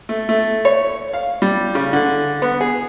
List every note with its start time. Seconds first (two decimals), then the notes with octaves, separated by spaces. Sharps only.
0.09 A3
0.29 A3
0.65 C#5
1.13 F5
1.42 G3
1.75 C#3
1.93 D3
2.42 B3
2.61 G#4